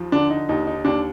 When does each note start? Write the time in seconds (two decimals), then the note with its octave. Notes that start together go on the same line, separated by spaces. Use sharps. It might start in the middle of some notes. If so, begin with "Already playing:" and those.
Already playing: D#2 F3
0.12 D3 D4
0.30 D#4
0.49 D#2 D#4
0.67 D#4
0.85 D#2 D4